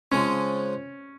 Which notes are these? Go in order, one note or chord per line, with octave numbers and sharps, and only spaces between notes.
C#3 F3 G#3 C#4